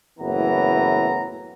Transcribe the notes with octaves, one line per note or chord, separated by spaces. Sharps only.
F#1 A2 E3 B3 A#5